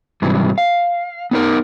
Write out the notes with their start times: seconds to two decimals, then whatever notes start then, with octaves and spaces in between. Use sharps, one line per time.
0.22 G#2 C3 E3 F#3 G3
0.58 F5
1.31 B3 D#4 A#4